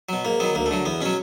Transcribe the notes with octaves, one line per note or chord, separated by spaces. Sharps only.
B2 F#3
G#2 A#3
D#3 F#3 B3
D2 A#3
A3
D3 F#3
E2 B3
B2 F#3 C#4